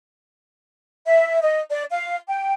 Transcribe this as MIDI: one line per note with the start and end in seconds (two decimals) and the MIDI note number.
1.07 1.39 76
1.42 1.60 75
1.71 1.83 74
1.92 2.16 77
2.28 2.53 79